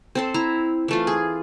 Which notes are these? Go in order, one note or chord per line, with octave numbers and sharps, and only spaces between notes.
C4 A4 C5
E4 A#5
E3 A3 F4
G#4